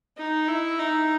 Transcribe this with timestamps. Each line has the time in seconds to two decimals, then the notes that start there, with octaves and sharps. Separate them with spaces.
0.17 D#4
0.48 E4
0.79 D#4